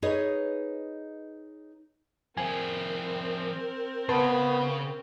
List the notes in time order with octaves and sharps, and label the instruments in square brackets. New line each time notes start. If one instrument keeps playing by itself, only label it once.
[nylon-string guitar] D#4 G#4 B4 C#5 D#5
[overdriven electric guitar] F3 G#4 [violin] C4 A#4 [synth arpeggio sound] G#5
[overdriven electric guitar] C#3 [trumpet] B3 [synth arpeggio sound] B4 A5 C6